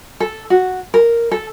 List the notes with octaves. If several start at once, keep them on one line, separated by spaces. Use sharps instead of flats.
A4
F#4
A#4
A4